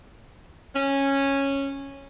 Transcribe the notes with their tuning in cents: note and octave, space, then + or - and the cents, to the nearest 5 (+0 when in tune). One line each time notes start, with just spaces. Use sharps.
C#4 -10